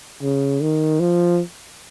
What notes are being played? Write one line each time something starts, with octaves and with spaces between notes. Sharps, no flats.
C#3
D#3
F3